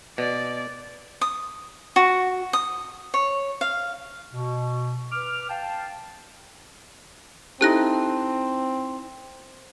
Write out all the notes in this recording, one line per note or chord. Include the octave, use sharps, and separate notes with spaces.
B2 D5
D#6
F#4
D#6
C#5
F5
B2
B4 D6 F6
F5 G5 A5
C4 D#4 E4 G4 A4 F#6 A#6